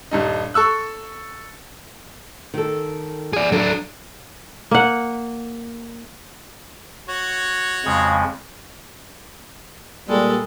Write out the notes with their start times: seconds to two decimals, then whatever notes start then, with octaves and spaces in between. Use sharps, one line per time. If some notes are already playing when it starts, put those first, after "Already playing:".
0.11 D#1 G2 D#4
0.54 A4 C#6 E6 F#6
2.54 D#3 A4
3.33 G#4 D5
3.52 F#3 D4 A4
4.71 A#3 F#5
7.09 F#4 C#5
7.85 F2 C#3 G#3
10.09 A#2 G3 G#3 A4